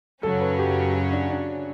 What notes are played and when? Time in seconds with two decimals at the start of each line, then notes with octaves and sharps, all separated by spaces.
0.23 F#2 C#3 F#3 C#4 A4
0.41 B4
0.59 G4
0.94 F#4
1.12 D4
1.30 D4